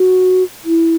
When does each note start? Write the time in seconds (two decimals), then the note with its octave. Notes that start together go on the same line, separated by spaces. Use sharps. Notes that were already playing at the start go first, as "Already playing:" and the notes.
Already playing: F#4
0.65 E4